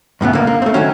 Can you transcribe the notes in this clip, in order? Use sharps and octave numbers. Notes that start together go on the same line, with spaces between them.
F#2 A2 C#3 B3
C#2 D3 A#3
A#3
A3 C4
D#3 F#3 C#4